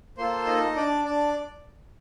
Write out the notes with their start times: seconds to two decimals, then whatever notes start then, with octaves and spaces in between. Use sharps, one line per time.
0.17 A#3 F4 A4 C5 C6
0.46 D#4 D#5
0.76 D4 D5
1.05 D4 D5